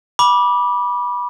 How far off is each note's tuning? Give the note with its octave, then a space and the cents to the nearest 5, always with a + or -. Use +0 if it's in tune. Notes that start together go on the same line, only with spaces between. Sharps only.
B5 -20 D6 +0